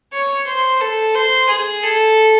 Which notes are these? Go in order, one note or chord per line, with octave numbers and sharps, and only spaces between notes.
C#5
C5
A4
C5
G#4
A4